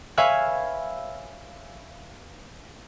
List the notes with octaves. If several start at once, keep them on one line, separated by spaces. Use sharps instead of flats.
B4 C#5 E5 F5 G#5